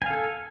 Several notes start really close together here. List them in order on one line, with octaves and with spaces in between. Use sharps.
G#5 F5 A4